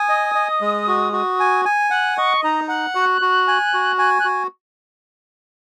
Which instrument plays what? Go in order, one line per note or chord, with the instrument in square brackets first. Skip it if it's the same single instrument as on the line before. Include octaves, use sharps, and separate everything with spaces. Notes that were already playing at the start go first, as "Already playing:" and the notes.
Already playing: [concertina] G#5 [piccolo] D#6
[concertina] D#5
D#5
G#3
F#4
F#4
G#5
G#5
[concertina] F#5 [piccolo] F#6
[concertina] D#5 [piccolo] C#6
[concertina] D#4 [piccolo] A#5
[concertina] F#5 [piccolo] F#6
[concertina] F#4
F#4
G#5
F#4
G#5
[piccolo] F#6
[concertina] F#4